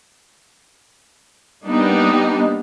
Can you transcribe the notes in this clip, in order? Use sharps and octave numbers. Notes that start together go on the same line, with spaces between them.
G3 A#3 B3 D4 D#4 G4